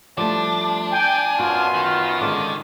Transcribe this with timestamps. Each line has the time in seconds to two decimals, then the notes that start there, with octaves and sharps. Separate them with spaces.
0.18 F3 G3 A3 D4 D6
0.92 G5 G#5
1.40 F#2 B3 F4 F#4
1.75 D#3
2.21 D3 G#3 C#4 D6